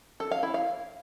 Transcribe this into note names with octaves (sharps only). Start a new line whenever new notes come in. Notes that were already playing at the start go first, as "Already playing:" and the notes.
A4
F5
E4
F5